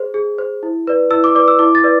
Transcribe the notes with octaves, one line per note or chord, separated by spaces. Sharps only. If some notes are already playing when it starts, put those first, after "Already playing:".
Already playing: G#4 C5
G#4
C5
E4
B4 D5
E4 E6
D6
B4 D5 D6
E6
E4 D6
A6
B4 D5